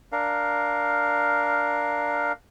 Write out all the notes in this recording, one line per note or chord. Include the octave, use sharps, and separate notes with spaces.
D4 A#4 F5